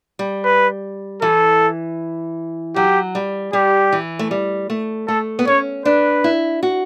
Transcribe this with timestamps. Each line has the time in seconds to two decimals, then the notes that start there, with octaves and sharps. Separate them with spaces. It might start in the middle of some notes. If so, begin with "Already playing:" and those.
0.19 G3
0.45 B4
1.22 E3 A4
2.76 F#3 G4
3.15 G3
3.53 G3 G4
3.92 E3
4.19 A3
4.31 G3
4.70 A3
5.08 A3 A4
5.39 B3
5.47 C#4 C#5
5.85 D4 B4
6.24 E4
6.63 F#4